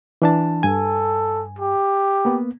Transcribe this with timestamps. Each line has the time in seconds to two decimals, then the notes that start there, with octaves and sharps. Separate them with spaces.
0.22 E3 D4 A5
0.63 G2 A4 G#5
1.59 G4
2.25 A#3 B3